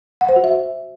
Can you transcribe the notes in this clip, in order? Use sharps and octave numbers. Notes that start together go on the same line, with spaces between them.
F#5
C5
F#4
E5